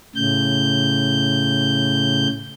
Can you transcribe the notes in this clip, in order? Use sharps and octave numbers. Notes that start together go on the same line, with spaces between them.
A2 C#3 G6